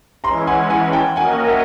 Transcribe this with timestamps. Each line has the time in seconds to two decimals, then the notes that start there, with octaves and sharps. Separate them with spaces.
0.24 E3 G#3 C#4 E4 A#5 C6
0.47 F#5 G#5
0.70 F#5 G#5
0.93 G5 A5
1.16 A#3 C#4 F#4 A#4 D#5 F#5 G#5
1.47 E5 F#5